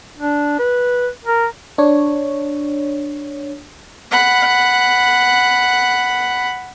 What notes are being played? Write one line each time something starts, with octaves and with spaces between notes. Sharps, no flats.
D4
B4
A#4
D4 C#5
F#5 B5